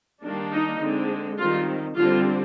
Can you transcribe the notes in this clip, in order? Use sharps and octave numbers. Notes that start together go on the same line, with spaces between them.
D#3 G3 A#3 D4
D#4
D3 G#3 C4
D#3 G3 C4 F4
D3 G3 C4 F4